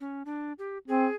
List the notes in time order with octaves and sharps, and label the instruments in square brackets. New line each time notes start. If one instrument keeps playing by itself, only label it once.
[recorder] C#4
D4
G4
[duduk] C4 [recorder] G#4